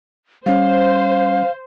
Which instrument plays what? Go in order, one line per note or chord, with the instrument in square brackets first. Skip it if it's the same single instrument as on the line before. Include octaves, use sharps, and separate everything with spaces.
[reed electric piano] G3 C#4 [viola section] C5 [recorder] F5